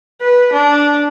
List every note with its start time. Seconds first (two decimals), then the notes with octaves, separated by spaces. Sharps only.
0.21 B4
0.53 D4